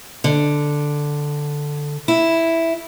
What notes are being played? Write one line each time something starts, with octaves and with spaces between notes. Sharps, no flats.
D3
E4